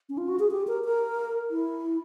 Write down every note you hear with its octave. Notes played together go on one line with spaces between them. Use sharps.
C#4
F4
F#4
G#4
G4
A#4
A#4
E4